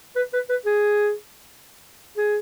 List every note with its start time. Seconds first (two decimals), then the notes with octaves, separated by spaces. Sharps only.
0.16 B4
0.33 B4
0.49 B4
0.66 G#4
2.17 G#4